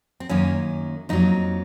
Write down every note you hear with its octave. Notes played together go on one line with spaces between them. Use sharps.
C4
F#2 D#3 A#3 C#4
F2 D#3 F#3 A#3 D#4